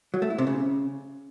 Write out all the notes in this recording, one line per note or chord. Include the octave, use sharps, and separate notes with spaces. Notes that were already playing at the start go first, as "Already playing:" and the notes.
F#3
A3
E4
C3
C#3